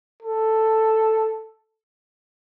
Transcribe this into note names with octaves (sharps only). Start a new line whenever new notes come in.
A4